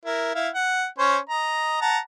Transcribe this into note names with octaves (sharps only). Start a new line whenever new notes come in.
E4 A#4
E4 F5
F#5
C#4 C5 C#5
D#5 A#5
F#5 A5 A#5